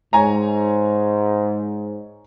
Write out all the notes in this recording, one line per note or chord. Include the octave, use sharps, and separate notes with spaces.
G#2 C#5 G#5 A#5